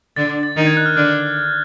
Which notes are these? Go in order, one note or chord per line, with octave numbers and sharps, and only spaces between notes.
D3 D4 A6
A6
A6
D#3 D#4 A6
G#6
F#6
F6
D3 D4 F6